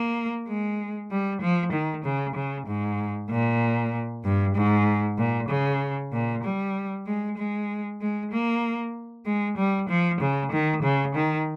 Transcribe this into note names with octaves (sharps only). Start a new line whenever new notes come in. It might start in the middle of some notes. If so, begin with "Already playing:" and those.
Already playing: A#3
G#3
G3
F3
D#3
C#3
C#3
G#2
A#2
G2
G#2
A#2
C#3
A#2
G3
G#3
G#3
G#3
A#3
G#3
G3
F3
C#3
D#3
C#3
D#3